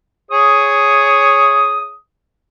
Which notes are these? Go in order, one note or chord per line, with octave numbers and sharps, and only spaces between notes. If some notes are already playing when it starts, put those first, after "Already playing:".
G#4 C#5 D#6